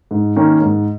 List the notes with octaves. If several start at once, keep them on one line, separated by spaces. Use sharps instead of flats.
G#2
D#3 A#3 C#4
G#2